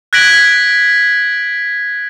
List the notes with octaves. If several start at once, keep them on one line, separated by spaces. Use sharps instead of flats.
F#6 G#6 A#6 B6 D7 F#7